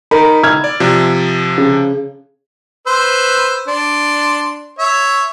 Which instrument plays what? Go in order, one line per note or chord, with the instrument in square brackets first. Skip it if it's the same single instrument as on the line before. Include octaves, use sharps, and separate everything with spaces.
[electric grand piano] D#4 B5 [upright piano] A#4
[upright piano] E6 F6 G#6
[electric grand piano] D5
C3 F3
[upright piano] C#3
[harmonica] B4 C5 E6
D4 C6
C#5 E5